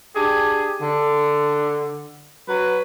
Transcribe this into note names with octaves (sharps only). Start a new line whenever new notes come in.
D4 G4 G#4
D3
F#3 B4